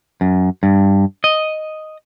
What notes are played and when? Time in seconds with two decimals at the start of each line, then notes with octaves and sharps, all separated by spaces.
0.21 F#2
0.63 G2
1.24 D#5